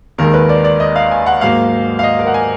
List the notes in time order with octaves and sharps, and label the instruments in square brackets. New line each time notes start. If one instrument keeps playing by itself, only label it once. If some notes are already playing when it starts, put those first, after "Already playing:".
[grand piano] D#2 D#3 G#3 A#4
B4
D5
D5
D#5
F5
G#5
F#5
G#2 F#3 A#3 F5
F5
D#5
A#4
F#5
G#5